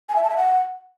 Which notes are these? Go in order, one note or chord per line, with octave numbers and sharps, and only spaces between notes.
G#5
E5
A5
E5
F#5